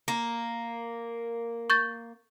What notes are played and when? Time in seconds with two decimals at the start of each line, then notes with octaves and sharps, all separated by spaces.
0.08 A#3
1.70 C#6 G6 A6